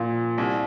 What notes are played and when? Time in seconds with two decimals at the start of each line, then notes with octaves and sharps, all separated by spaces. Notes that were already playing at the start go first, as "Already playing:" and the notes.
Already playing: A#2 F3
0.38 C2